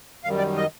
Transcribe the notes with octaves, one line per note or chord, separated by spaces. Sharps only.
F#2 D#3 G3 F5
D5
D#5